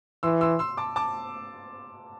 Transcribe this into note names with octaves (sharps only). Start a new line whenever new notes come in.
E3 C6 E6
C6 E6
C6 E6
A5 D6
A5 D6